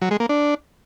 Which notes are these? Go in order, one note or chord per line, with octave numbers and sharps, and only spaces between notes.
F#3
G#3
A#3
D4